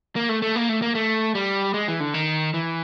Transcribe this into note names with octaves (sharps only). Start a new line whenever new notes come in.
A#3
A3
A3
A#3
A3
A#3
A3
G3
G#3
E3
D3
D#3
E3